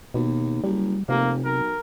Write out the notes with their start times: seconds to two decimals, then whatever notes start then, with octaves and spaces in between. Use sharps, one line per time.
0.14 D#2 B2
0.64 F#1 G3
1.09 F1 C3 A#3
1.44 B1 A#4